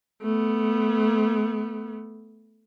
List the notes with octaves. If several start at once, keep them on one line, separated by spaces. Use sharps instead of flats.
A3 B3